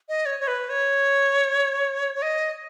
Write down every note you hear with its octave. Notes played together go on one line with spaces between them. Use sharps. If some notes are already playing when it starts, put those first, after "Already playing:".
D#5
C#5
C#5
B4
C#5
C#5
D#5